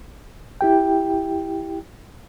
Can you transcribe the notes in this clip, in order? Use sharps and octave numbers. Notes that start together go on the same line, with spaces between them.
E4 G4 G5